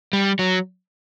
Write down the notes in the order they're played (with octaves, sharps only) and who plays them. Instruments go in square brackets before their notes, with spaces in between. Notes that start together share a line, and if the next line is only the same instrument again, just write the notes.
[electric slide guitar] G3
F#3